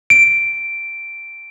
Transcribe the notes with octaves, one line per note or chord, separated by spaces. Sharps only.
D7